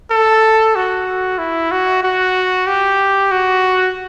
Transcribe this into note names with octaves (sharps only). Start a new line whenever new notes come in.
A4
F#4
E4
F#4
F#4
G4
F#4